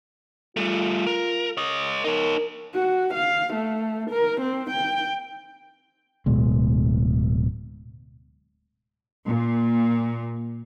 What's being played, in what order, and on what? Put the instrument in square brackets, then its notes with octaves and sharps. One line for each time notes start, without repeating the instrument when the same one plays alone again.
[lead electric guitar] G3 A3 [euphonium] F4
[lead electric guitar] A#4
C#5 D#5
[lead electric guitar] D#4 C#5 [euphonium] A#4
[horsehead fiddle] F#4
F5
A3
A#4
C4
G5
[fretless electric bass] D1 B2 G#3
[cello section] A#2